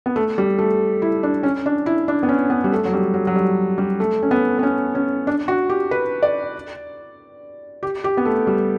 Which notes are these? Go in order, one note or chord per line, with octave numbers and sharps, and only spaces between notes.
B3
A3
G3
A3
E4
D4
C#4
D4
E4
D4
B3
C#4
B3
G3
A3
F#3
G3
F#3
F#3
G3
G3
A3
C#4
B3
B3
C#4
C#4
D4
F#4
G4
B4
D5
G4
G4
B3
A3
G3